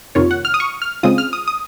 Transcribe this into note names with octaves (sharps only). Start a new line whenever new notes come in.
F2 C3 D#3 A#3 F4 C#5
F#5
F6
D#6
C#6
F6
C#3 G#3 C4 F4 D#6
F6
D#6
D#6